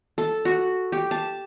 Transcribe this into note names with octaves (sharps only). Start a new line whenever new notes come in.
A4
F#4
G4
A5